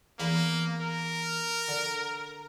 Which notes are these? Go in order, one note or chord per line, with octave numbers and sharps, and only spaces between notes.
E2 A#3 B5
A#4
D3